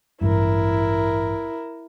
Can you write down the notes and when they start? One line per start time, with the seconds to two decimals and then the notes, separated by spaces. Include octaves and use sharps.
0.21 A1 G2 E4 A#4